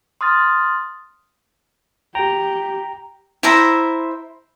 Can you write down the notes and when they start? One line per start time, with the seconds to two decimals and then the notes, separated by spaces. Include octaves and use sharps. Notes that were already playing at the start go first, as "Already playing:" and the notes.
0.21 C6 D#6 F6 A6
2.15 G4 G5 A#5
3.43 E4 C5 E5 A#5